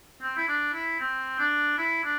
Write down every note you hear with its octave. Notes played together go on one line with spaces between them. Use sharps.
C4
E4
D4
E4
C4
D4
E4
D4